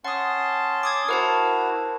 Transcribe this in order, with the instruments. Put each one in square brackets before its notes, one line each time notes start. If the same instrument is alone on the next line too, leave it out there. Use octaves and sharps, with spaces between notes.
[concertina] C#4 A5 C6 [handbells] F#5 D#6
[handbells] D6 D#6 G#6
[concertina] E4 F#4 [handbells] A#4 C5 A5